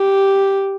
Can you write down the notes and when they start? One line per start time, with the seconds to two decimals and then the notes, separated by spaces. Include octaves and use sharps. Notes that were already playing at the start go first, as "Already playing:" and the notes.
Already playing: G4